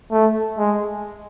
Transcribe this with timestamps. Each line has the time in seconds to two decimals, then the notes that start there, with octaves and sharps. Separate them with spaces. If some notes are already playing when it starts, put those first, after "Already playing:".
0.12 A3
0.58 G#3